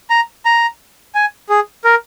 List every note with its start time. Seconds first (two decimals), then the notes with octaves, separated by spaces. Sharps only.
0.10 A#5
0.45 A#5
1.15 G#5
1.49 G#4
1.85 A#4